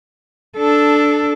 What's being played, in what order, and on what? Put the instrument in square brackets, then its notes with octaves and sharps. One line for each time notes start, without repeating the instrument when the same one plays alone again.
[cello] D4 A4